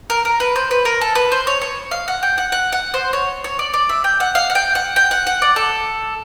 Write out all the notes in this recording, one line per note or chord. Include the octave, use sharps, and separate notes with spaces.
A#4
A#4
B4
C5
B4
A#4
A4
B4
C5
C#5
C#5
F5
F#5
G5
F#5
F#5
F#5
C5
C#5
C#5
D5
D5
E5
G5
F#5
F5
F#5
G5
F#5
G5
F#5
F#5
D5
A4